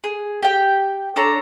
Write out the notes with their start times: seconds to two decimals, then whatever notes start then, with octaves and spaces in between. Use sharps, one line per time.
0.04 G#4
0.42 G4 G5
1.16 D4 A4 C#5 A#5